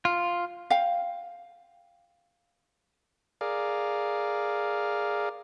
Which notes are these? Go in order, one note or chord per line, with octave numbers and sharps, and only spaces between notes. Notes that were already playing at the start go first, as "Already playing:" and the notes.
F4
F5 G5
G#4 A#4 D5 F5